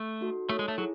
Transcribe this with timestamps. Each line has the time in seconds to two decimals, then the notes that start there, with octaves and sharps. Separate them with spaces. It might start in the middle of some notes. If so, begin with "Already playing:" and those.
Already playing: A3
0.21 D#4 F#4 A4
0.49 A3 D#4 A4 C#5
0.59 G#3
0.68 A3
0.78 F#3 E4 G#4